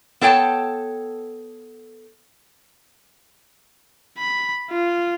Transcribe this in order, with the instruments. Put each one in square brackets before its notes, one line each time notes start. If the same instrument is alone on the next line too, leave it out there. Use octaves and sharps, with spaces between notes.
[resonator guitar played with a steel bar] B3 A4 C#5 G5 A5
[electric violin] B5
F4